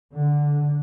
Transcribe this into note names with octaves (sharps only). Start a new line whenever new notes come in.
D3